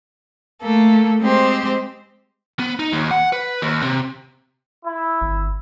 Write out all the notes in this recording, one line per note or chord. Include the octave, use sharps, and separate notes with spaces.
A3 A#3 A4
G#3 C4 G4 C5
B3
D#4
D#2
F#5
B4
D#2
C3
E4
G1